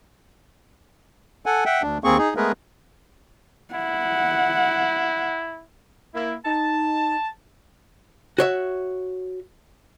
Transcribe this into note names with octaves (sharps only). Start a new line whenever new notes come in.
A4 F#5 G#5
E5 F#5 G5
D2 D4
D#2 A#3 C4 G#4 C#6
D#4 G#4
G#3 A3 B3 G#4 A#4 B4
E4 F#5
A#3 E4
D#4 A5
F#4 C#5 E5